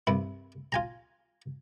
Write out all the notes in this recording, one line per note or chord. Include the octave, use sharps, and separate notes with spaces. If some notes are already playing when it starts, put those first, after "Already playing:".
C2 G2 E4
F4 G#5 A#5